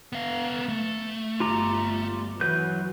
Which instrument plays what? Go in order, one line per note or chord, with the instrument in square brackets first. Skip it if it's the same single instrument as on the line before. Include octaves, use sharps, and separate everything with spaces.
[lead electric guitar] B3 F5
A3
[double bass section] G1 [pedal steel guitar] F4 G4 A#5
[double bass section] E3 [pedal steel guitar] F#3 B4 G6